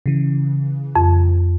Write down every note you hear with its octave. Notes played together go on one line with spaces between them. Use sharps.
C#3 E3
F2